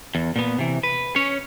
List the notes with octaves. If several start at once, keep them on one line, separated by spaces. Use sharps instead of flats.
E2
A#2 B3
C3 E3
B4
C#4 C#5